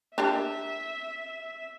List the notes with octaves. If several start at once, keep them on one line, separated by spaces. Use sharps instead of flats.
D4 G4 A#4 E5